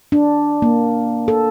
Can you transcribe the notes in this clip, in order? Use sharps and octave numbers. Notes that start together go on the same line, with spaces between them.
D4
A#3
A4